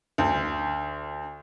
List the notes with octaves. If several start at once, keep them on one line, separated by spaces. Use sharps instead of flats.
D2